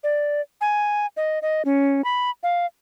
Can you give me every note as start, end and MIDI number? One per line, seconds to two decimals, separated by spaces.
0.04 0.41 74
0.61 1.06 80
1.17 1.39 75
1.42 1.62 75
1.65 2.02 61
2.04 2.30 83
2.43 2.66 77